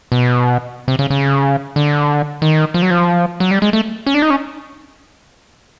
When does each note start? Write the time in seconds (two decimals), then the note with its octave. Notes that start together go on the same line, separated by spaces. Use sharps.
0.12 B2
0.88 C3
0.99 C#3
1.10 C#3
1.76 D3
2.42 D#3
2.74 F3
2.82 F#3
2.90 F3
3.40 F#3
3.51 G3
3.62 G#3
3.73 A3
4.06 C#4
4.14 D4
4.22 D#4
4.30 C#4